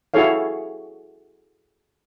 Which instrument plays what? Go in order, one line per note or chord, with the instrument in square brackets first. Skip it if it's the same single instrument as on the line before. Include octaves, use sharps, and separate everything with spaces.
[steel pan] E4 F#4 G#4 A4 C#5 F5